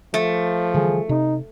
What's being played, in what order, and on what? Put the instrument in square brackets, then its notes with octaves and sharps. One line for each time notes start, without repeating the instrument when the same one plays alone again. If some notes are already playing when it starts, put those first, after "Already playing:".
[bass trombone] F3 [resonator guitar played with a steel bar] A3
[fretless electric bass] D3 E3 G3 [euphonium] G#4
[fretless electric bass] C3 [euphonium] D#4